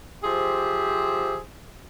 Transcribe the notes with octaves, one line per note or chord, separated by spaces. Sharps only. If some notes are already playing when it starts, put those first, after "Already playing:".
F3 G4 G#4 C5 E5